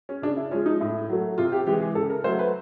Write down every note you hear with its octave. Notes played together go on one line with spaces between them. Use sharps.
C#4
C#3 D4
E4
F3 G#3 C#4
D#4
A2 E4
F#3 A3
C3 F4
G4
E3 G#3 G4
G#4
C#3 A4
A#4
F#3 A3 C5
B4